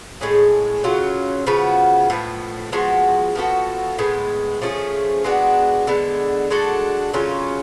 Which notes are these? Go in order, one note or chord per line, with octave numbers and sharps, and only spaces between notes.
A2 G#3 C#4 G#4
C#3 F#3 C#4 F4
C#3 F3 B3 F#4
A2 F3 B3
F3 G#3 B3 F#4
F3 B3 F#4 A4
A2 G#3 B3
F3 A3 C#4 G#4
G#3 B3 D4 F#4
D3 G#3 B3
G#3 D4 F#4 A4
C#3 F#3 C#4 F4